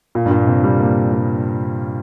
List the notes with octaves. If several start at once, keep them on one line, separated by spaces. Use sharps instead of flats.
A#2
G2
A#2
C3
G3
A#3
G3